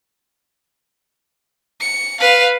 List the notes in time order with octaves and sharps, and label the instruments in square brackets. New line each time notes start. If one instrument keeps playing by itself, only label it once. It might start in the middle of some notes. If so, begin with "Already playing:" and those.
[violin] C#7
B4 F5